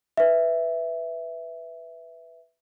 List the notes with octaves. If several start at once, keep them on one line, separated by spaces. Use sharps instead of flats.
B4 E5